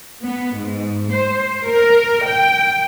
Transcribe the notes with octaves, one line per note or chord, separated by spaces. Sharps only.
B3
G#2
C5
A#4
G5